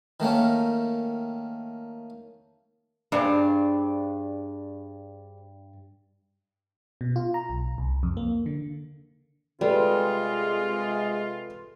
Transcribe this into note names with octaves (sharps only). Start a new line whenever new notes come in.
D#3 A3 A#3 C#4
G2 D4 G#4 C5
B2
F4
A#5
B1
C2
F2
A#3
D3
C3 G3 G#3 F4 A4 B4